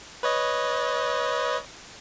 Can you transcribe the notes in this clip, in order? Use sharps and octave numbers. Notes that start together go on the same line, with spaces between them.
B4 C#5 D#5